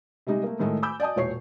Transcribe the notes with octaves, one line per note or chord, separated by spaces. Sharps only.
C3 G3 G#3 D#4
A3 A#3
A2 D#3 G#3 A3
G#5 B5 D6 E6 G6
D5 D#5 G#5 A5 D#6
E1 A#2 C#5 C#6 C7